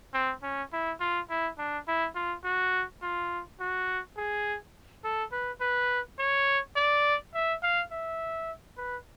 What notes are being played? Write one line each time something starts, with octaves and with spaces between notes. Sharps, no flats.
C4
C#4
E4
F4
E4
D4
E4
F4
F#4
F4
F#4
G#4
A4
B4
B4
C#5
D5
E5
F5
E5
B4